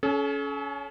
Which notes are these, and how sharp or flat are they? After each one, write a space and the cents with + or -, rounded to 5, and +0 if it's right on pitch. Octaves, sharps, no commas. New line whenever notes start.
C#4 +15 A4 -40